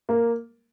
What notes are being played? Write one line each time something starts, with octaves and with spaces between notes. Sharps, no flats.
A#3